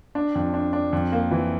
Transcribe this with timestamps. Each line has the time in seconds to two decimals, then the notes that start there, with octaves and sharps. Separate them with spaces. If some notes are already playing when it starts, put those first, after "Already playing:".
0.15 D4
0.35 F2
0.54 D4
0.73 D4
0.93 F2
1.12 A#3
1.31 E3